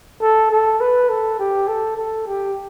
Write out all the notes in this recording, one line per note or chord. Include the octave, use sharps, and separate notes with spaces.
A4
A4
B4
A4
G4
A4
A4
G4